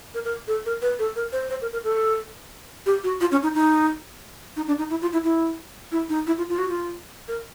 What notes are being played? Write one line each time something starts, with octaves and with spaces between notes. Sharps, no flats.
A#4
A#4
A4
A#4
B4
A4
A#4
C5
C5
A#4
A#4
A4
G4
F#4
F4
C#4
D#4
D#4
D#4
D4
D#4
E4
F4
E4
E4
E4
D#4
E4
F4
F4
F#4
F4
A#4